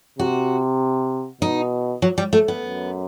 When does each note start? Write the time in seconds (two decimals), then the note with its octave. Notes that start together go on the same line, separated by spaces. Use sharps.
0.19 C3 F#4
1.41 B2 D#4
2.02 F#3
2.18 G3
2.33 A3
2.48 B3
2.64 F#2